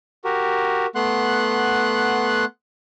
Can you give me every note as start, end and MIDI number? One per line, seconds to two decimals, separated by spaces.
0.24 0.87 66
0.24 0.87 67
0.24 0.87 70
0.95 2.45 57
0.95 2.45 59
0.95 2.45 78
0.95 2.45 84
0.95 2.45 90